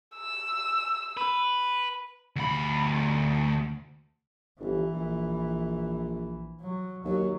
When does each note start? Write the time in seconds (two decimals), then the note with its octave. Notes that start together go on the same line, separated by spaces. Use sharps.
0.16 E6
1.17 B4
2.36 D2 B5
4.60 G1 E3
4.94 A#1
6.61 F#3
7.05 D#2 F#3